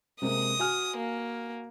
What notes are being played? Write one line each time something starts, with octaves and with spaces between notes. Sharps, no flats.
C3 G#3 A#3 D#6
F#4 G#5 F6
A#3